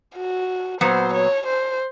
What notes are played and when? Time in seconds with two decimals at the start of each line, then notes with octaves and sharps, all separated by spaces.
0.16 F#4
0.81 A#2 F#3 B3 C5
1.13 C#5
1.46 C5